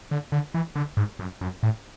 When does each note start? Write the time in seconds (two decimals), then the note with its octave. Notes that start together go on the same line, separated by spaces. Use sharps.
0.11 D3
0.32 D3
0.54 E3
0.76 D3
0.97 G#2
1.19 F#2
1.41 F#2
1.63 A2